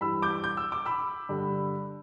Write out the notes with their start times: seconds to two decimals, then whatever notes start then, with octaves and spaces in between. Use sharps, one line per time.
0.01 G2 E3 B5 E6
0.22 D6 G6
0.44 G6
0.57 E6
0.72 D6
0.86 B5 E6
1.29 G2 D3